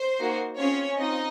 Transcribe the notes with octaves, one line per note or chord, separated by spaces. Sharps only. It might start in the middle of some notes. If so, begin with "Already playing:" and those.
Already playing: C5
A#3 D#4 F#4
C4 C#4 F4 G#4 C#5
C4 D#4 F4 D#5